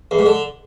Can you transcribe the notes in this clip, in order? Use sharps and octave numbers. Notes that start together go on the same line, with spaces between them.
E2
G#2
D3